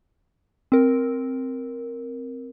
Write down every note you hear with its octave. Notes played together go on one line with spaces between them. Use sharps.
C4 A#4